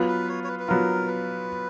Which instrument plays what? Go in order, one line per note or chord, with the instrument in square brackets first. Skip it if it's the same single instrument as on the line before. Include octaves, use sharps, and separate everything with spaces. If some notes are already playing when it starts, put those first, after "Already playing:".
Already playing: [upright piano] F#3 B3 F4
[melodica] B4
C#5
C#5
B4
B4
[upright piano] F#3 B3 F4 [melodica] A#4
[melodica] B4